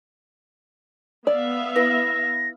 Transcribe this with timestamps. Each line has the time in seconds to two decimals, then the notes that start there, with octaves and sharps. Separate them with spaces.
1.27 B3 D5 E5 F5
1.76 E4 B4 A#6